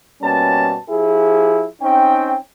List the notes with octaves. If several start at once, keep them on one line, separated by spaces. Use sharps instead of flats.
B2 G3 A#3 C#4 A5
F3 E4 G4 G#4
C4 C#4 D#4 G5